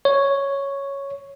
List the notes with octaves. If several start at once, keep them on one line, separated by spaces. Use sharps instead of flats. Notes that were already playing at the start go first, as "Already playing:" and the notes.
C#5